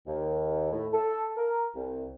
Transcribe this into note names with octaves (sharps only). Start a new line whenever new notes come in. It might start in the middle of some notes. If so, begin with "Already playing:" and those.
D#2
A2
A4
A#4
C2